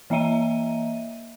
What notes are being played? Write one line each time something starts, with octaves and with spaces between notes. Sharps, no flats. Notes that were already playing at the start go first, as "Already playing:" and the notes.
E3 A#3 D#5 E5 A#5 D#7